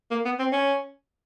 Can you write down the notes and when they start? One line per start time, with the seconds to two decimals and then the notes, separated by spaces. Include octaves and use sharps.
0.11 A#3
0.25 B3
0.39 C4
0.52 C#4